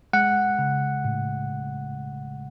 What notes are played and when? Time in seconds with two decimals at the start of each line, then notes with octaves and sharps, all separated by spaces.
0.13 G#3 F#5
0.59 C#3
1.05 A2